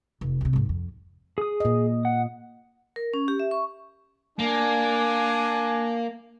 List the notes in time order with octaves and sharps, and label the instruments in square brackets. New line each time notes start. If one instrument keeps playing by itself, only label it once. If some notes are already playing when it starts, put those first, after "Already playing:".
[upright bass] F1
D2 C3
D#2 G#2
F2
[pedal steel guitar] G#4 D#6
[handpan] A#2 D#5
[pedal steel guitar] F#5
[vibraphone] A#4
C#4
G4
E5
C#6
[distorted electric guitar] A#3 [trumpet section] D4 G#5